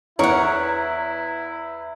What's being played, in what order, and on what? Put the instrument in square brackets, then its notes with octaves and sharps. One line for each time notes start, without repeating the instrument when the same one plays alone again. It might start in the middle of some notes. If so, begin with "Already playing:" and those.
[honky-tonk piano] E2 [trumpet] E4 [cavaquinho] A#4 F#5 [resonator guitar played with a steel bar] C#5